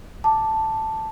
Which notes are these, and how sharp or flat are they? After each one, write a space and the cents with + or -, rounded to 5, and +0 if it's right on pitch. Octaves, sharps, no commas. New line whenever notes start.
A5 +0 D6 +0